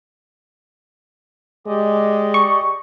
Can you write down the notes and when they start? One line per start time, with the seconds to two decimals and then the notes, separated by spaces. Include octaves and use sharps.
1.67 G#3 G4 D5 D#5
2.34 C#6